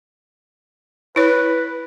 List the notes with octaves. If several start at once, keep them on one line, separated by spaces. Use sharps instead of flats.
E4 B4 C#5